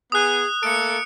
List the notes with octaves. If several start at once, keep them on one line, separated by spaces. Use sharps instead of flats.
B3 G#4 D#6 F#6
A3 A#3 A4 C#7 D7